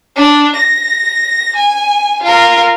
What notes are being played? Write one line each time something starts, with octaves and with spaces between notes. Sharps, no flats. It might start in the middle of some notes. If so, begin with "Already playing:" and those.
D4
A#6
G#5
F4 A#4